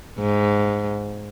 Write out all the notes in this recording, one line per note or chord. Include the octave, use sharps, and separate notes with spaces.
G#2